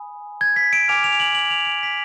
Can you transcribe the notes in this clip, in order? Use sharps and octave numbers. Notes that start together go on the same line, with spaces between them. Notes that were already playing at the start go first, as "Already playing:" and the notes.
Already playing: G#5 B5 D#6
G#6
B6
D7
G#5 D6 F6 F7
F7
F#7
F#7
F7
D7
B6